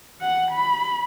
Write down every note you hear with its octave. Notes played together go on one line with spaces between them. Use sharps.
F#5
B5